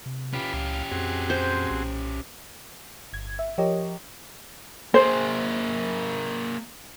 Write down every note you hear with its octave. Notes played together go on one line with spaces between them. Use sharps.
C3
C#4 F4 G4 B4 B5
C#2 F5
F2 C4 F#4 G#4
C5
B1
G1 G#6
E5
F3 G4 A#4 C#5 D#5
A#3 G#4 C5